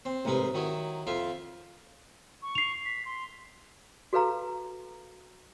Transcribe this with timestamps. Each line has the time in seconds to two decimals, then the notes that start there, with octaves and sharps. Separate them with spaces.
0.05 C4
0.25 A1 G#2 C3 A#4 B4
0.54 D#3 F#3 E4
1.07 F2 F4 E5 F5
2.42 C#6
2.55 C7 F7
2.85 B6
3.05 C6
4.13 F#4 A4 B4 F5 A#5